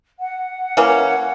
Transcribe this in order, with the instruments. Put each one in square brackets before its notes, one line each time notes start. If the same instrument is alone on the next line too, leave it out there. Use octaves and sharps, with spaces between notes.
[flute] F#5
[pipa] E3 A#3 C#4